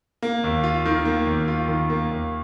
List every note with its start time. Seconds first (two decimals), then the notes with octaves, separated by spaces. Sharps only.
0.22 A#3
0.44 D#2
0.64 F4
0.85 D#3
1.05 A#3
1.27 D#2
1.48 F4
1.68 D#3
1.90 A#3
2.10 D#2